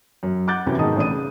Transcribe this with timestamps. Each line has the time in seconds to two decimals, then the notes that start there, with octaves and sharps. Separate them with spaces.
0.23 F#2
0.47 F#5 D6 F#6 G6 A6
0.67 F#2 C3 E3 F#3 C4 C#4
0.78 G#2 B2 D#3 A5 D#6
0.96 A1 A2 D4 D#6 D#7
1.11 C#3